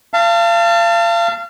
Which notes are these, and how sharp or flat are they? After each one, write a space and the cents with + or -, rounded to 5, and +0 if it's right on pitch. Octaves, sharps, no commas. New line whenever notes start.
F5 -30 A5 +25